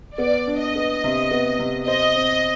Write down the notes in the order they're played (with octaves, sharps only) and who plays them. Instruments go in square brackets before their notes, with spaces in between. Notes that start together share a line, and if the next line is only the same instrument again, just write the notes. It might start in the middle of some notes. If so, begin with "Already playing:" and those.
[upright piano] B3 [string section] D5
[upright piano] D4
[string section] D#5
[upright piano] B3
C3
B3
C3
[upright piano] C5 [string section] D#5
[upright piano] C4